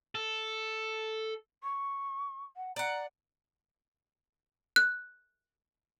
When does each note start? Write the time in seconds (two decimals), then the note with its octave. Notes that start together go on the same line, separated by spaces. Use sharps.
0.15 A4
1.63 C#6
2.57 F#5
2.76 D5 F#5 A#5
4.76 F#6